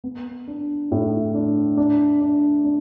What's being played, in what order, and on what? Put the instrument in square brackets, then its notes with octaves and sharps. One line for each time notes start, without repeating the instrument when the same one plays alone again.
[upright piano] B3
D4
A2
D4
D4
D4
D4